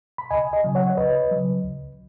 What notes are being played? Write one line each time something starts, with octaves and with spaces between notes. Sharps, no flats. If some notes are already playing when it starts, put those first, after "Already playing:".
B5
C#2 D#5 G#5
D#5 G#5
C#3 F#3
C#5 F#5
C#5
C#2 B4 D#5
C#3 F#3
C#2